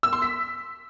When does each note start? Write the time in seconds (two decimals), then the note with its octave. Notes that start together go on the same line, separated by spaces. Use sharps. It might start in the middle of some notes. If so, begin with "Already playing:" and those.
0.03 E6
0.13 C6
0.22 B6